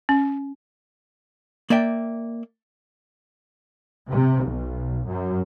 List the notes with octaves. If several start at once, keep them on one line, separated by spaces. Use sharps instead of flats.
C#4
A#3 D5 E5 G5
C3
B1
F#2